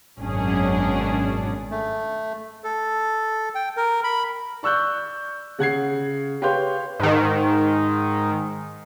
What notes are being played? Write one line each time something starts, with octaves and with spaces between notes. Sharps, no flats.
G#1 F#2 B2 C#4 D4 G#4
A3
A4
G5
A#4
B5
D5 C#6 E6 F#6 G6
C#3 F#5 G#6 C7
G4 B4 C#5 F5 C6 G6
G#2 D#3